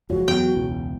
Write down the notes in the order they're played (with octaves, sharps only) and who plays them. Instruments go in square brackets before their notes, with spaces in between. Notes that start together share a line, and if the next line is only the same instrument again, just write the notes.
[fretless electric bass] F#1 F2 G#3 [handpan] F4 C#5 [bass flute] F#4
[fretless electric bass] E2 F#3 [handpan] B3 [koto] G5
[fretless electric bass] E1 C#2 [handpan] E4